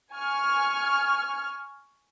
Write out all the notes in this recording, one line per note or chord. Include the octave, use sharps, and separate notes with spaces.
G#5 C#6 F6